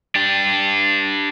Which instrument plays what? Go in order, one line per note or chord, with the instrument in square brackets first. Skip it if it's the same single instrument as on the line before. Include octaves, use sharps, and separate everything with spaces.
[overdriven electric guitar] D4 G4